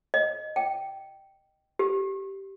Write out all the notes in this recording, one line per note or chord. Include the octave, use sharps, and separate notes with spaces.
D#5
G5
G4